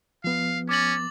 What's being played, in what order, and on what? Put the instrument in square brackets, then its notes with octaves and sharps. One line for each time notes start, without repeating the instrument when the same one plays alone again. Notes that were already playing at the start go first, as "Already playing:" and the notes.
[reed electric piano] F3 B3 [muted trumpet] F5
[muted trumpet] C#4 [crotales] D6 A6 F#7